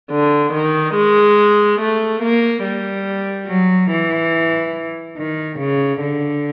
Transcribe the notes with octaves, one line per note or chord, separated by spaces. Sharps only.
D3
D#3
G#3
A3
A#3
G3
F#3
E3
D#3
C#3
D3